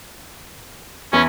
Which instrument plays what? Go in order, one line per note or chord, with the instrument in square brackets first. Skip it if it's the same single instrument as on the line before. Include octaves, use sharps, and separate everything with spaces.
[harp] E2 B4 [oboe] C#4